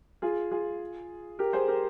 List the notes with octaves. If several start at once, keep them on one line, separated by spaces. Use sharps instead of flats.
F4 G#4
F4 G#4
G4 A#4
G#4 C5
G4 A#4